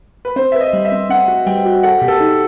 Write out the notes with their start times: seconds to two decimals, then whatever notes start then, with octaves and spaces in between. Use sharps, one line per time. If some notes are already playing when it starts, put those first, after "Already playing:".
0.25 B4
0.36 C4 C5
0.52 B4 E5
0.61 D#5
0.73 G3
0.85 E5
0.92 C4
1.09 C4 F#5
1.28 F#4
1.47 G3 G5
1.65 F#4
1.83 A4 F#5
1.98 B2 G4
2.08 A4
2.20 D#4